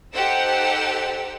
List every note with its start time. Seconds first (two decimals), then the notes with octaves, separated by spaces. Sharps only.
0.13 D#4 G4 A4 C5 F#5 E6